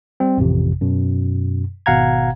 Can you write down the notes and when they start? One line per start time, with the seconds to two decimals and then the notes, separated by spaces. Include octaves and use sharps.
0.20 G3 C4
0.38 A1 F2 C3
0.81 F#2 B2
1.86 G#1 B2 F5 F#5 A#5 G#6